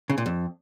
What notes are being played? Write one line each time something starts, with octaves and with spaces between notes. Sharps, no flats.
C#3
A#2
F2